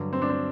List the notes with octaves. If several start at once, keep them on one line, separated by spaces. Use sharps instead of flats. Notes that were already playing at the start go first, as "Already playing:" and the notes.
Already playing: G2 D3 F#3
C4
D4
C4